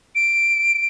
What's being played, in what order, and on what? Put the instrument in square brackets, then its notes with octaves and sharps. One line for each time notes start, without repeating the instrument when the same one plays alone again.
[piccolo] D7